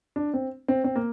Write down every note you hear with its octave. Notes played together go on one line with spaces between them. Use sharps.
D4
C4
C4
C4
A#3